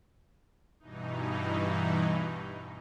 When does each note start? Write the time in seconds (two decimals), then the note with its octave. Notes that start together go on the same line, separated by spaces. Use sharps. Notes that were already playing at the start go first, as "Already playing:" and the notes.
0.79 G2 B2 E3 D#4